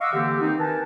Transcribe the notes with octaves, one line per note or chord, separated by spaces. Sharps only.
D#5 F5 F#5 C#6 D6 E6
D3 E3 A#3 C4 G4
D#3 C4 D#4
A#4 B4 G#5 A5